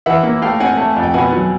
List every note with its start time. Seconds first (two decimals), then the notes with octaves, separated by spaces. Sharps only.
0.06 E3 E5 F#5
0.23 A#3
0.42 A3 F5 G5
0.60 C4 F#5 G#5
0.77 A3
0.96 F2
1.03 G5
1.14 B2 F#5 G#5
1.32 F#3